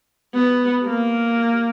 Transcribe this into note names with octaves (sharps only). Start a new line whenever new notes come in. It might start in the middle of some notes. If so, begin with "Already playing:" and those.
B3
A#3